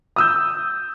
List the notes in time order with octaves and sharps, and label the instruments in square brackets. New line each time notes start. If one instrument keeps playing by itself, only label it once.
[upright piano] D#6 E6 G6